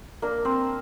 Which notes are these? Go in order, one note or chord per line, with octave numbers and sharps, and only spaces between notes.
A#3 D4 A#4
C4 C5